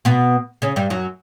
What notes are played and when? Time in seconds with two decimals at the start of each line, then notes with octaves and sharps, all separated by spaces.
0.05 B2 B3
0.62 C#3 C#4
0.76 G2 G3
0.90 F#2 F#3